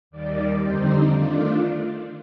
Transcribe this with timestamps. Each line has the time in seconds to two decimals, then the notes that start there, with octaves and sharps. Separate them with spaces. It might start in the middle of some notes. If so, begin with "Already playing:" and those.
0.10 D#2 D#3 G3 D5
0.61 F2 D3 G3 C4 D#4 C5
1.12 D#3 A3 D4 F4 D5